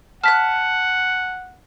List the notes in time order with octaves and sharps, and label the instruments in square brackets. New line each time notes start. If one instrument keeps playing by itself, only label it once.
[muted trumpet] F#5 [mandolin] A5 F#6 [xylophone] F6 B6